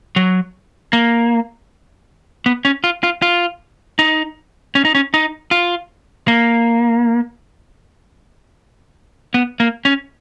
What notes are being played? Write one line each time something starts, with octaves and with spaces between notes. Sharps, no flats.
F#3
A#3
B3
C#4
F4
F4
F4
D#4
C#4
D#4
C#4
D#4
F4
A#3
B3
A#3
C#4